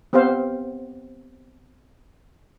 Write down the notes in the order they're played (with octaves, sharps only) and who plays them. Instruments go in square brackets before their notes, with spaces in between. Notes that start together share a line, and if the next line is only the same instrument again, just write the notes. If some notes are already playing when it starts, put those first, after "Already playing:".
[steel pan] B3 C4 G4 C5 F5